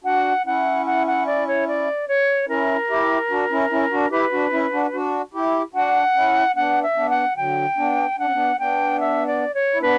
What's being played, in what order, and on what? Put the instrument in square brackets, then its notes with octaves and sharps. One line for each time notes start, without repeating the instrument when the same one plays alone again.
[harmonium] D4 F#4 [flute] F#5
[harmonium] C#4 E4 [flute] F#5
[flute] F#5
F#5
D5
C#5
D5
C#5
[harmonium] C#4 E4 [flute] A#4
[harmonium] E4 G4
D4 F#4
C#4 E4
C#4 E4
D4 F#4
[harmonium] E4 G4 [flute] B4
[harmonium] D4 F#4
C#4 E4
D4 F#4
D4 F#4
E4 G4
[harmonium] D4 F#4 [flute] F#5
[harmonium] C#4 E4
[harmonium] B3 D4 [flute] F#5
[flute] E5
[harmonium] B3 D4
[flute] F#5
[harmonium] D3 F#3 [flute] G5
[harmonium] B3 D4
[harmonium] D4 [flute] F#5
[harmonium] C#4
B3 D4
[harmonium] B3 D4 [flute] G5
[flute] E5
D5
C#5
[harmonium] E4
[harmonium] B3 D4 [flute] B4